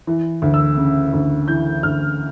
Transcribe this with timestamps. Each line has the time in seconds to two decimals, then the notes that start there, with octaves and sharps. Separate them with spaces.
0.07 E3
0.42 D2
0.54 E6
0.77 C#3
1.13 D2
1.48 E3 G6
1.83 D2 F6